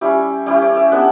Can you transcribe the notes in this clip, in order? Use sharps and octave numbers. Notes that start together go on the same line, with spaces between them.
G3 C#4 E4 G4
G3 C#4 E4 G4
D5
E5
G3 B3 D4 F#5